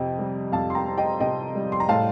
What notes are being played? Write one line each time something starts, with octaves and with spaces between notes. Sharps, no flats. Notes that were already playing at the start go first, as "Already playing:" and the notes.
Already playing: F2 C3 C4 D#5 G5
G3
F2 F5 A5
C6
G5 A#5
C4
D#5 G5
C3 D#5 G5
G3
C6
A#5
A2 F5 A5